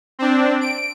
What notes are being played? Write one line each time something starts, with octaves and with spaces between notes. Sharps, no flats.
C4 D4
D7